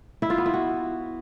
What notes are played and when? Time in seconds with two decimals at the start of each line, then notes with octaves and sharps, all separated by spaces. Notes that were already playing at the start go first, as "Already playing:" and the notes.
0.22 E4
0.30 F4
0.38 B3
0.46 E4
0.54 F#4